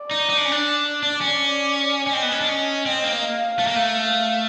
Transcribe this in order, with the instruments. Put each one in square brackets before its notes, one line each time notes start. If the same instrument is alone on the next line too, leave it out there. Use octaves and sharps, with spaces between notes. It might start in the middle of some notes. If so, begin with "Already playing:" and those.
Already playing: [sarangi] D5
[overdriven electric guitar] D#4
D#4
D4
C#4
D4
[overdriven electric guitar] D4 [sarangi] D5
[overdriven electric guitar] C#4
[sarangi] D5
[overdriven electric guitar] C#4
[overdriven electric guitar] C4 [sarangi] D#5
[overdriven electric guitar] B3
C#4
D4
C#4
[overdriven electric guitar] C4 [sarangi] D#5
[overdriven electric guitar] A#3
[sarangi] F5
[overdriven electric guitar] A3
A#3
A3
[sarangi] F5